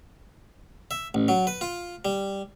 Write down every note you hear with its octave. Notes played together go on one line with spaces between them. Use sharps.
E5
A1
F#3
B4
F4
G3